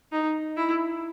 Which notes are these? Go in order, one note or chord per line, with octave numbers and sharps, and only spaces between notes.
D#4
E4